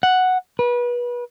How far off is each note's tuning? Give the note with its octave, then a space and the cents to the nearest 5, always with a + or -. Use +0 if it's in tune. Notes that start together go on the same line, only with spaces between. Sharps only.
F#5 +0
B4 -30